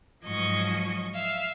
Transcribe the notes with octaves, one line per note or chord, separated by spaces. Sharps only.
G#2 F3 F#3 D#5 C#6 G#6
E5 F5